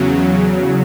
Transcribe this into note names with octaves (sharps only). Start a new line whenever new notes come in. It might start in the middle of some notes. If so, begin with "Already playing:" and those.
Already playing: E2 C#3 F#3